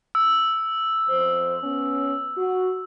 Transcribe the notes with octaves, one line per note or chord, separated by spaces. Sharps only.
E6
F2 C5
B3 C#4
F#4